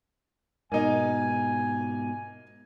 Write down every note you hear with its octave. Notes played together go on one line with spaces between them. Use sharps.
G#2 B2 A#3 D#4 G#5